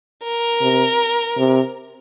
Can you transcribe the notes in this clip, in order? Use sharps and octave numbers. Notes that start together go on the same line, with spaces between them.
A#4
C3
C3